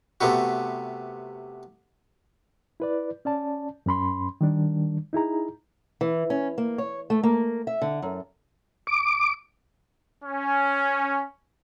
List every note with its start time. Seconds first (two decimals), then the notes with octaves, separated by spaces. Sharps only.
0.21 C3 A3 B3 F#4
2.80 E4 B4 D5
3.25 C#4 D5 A5
3.86 F#2 C#4 B5 C6
4.41 D#3 G3 D4
5.13 D#4 E4 G#4 A#5
6.01 E3
6.30 C#4
6.58 A#3
6.78 C#5
7.10 A3
7.23 A#3
7.67 E5
7.82 D3
8.02 F#2
8.87 D6
10.24 C#4